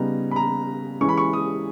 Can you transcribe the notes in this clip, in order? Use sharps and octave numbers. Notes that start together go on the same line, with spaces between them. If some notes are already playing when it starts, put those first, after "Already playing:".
Already playing: C#3 G3 B3 D#4 A#5
B5
A#5
E3 G#3 C#4 C#6
B5
C#6
D#6